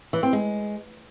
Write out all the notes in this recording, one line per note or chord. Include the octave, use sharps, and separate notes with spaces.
E3
C4
G#3